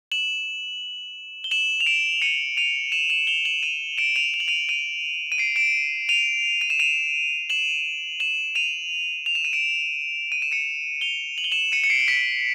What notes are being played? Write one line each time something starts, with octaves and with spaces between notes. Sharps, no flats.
E7 F#7
G7
E7 F#7
F7
D7 E7
C#7 D#7
D#7 F7
E7 F#7
E7 F#7
F7 G7
E7 F#7
D#7 F7
D7 E7
D#7 F7
F7
F#7
D#7 F7
D#7 F7
D#7
C7 D7
D7 E7
D#7 F7
D#7
E7
D#7 F7
E7 F#7
E7 F#7
D#7 F7
F7
E7
D#7
D7 E7
D#7
E7
C#7 D#7
F7 G7
F#7
G7
E7 F#7
C#7 D#7
C#7
C7 D7
D7
B6 C#7